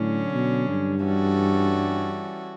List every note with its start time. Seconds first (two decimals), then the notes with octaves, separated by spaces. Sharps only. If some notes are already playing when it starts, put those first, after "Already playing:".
Already playing: A2 D3 F#3 C#4
0.33 B2
0.69 G2
1.03 E3 G3 C#4 F#4 A4